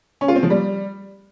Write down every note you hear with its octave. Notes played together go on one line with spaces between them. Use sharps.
C#4
F4
C4
F3
G3